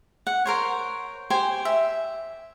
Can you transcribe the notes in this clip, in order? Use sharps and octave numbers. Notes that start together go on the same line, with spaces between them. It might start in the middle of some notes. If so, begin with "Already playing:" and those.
F#5
A#4 C5 C#5
G4 C5 G#5
E5